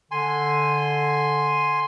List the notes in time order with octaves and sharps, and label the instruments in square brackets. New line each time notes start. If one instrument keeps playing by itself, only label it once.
[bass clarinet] D3 [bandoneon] G#5 C6